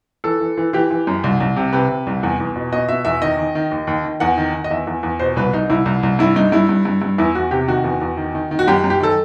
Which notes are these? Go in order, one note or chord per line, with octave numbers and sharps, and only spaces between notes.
E3 A4
E3
E3
E3 G4
E3
F#2
C2
C2
C3
C3 B4
C3
C2
E2
E2
B2
B2 D#5
B2 E5
E2 E5
D#3 D#5
D#3
D#3
D#2
D#2
D#3
E2 F#5
D#3
D#3
D#5
E2 E5
E2
E2
B2 C5
C2 B4
C2 D#4
C2 E4
C2
C2
G2 E4
G2 D#4
G2 E4
G2
G2
G2
E2 E4
E2 F#4
C3 G4
D#3 F#4
E2
E2
D#3
D#3
D#3
F#4
F#2 G4
F#2
G4
D#3 A4